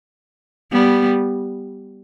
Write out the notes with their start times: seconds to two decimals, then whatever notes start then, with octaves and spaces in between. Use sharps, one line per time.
0.72 G3 B3